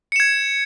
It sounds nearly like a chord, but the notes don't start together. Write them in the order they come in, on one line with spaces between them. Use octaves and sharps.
C#7 E7 G#6